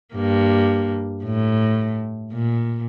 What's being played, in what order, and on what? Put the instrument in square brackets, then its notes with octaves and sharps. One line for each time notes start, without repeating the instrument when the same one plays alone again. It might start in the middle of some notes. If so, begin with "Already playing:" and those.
[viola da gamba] G2 A#3
A2
A#2